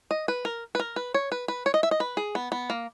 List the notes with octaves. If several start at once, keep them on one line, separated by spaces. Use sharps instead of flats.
D#5
B4
A#4
B4
A#4
B4
C#5
B4
B4
C#5
D#5
E5
D#5
B4
G#4
B3
B3
A#3